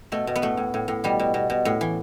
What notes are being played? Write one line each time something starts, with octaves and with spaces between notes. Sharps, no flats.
B2 A3
B2
B3
A2 A3
A2
A2
A2
B2 G3
B2
B2
B2
A2
E3